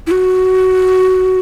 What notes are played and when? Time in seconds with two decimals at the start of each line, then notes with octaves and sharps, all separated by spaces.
0.07 E4
0.11 F#4